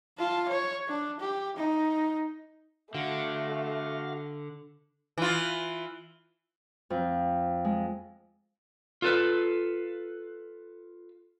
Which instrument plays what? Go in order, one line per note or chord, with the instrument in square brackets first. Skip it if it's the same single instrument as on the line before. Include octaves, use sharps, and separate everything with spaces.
[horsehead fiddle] F4 A5
C#5
D4
G4
D#4
[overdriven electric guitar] D3 [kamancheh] A3 [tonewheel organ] F#4 F5
[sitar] E3 F4
[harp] F2
G#3
[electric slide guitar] F4 A4 B4